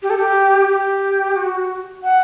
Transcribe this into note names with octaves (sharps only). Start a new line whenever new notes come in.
G4
A4
G4
G4
F#4
F#5